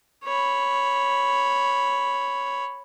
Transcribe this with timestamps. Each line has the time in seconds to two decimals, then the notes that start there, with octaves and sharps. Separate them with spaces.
0.25 C#5 B5